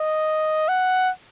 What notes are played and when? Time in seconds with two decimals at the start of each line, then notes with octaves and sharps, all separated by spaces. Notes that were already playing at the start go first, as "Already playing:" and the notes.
Already playing: D#5
0.69 F#5